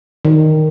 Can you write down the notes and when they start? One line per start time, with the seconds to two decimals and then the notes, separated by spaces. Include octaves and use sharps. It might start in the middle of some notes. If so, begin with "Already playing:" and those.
0.25 D#3